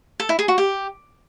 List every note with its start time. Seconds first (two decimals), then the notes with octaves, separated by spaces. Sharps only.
0.20 A4
0.29 E4
0.39 G#4
0.48 F#4
0.58 G4